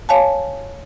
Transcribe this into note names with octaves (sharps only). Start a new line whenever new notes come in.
C#5 F5 G#5 A5